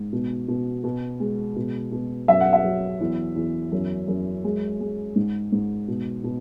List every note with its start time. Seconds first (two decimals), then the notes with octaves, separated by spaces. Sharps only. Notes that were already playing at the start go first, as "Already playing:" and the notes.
Already playing: G#2
0.13 B2
0.48 B2
0.84 B2
1.20 G#3
1.56 B2
1.92 B2
2.28 F#2 E5
2.40 F#5
2.53 E5
2.64 F#3
3.00 E2
3.36 E2
3.72 F#2
4.08 F#2
4.44 G#3
4.80 G#3
5.16 G#2
5.52 G#2
5.88 B2
6.24 B2